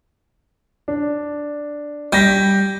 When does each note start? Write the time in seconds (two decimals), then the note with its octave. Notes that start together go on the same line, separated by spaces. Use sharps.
0.88 D4
2.13 G3 G6 A#6 B6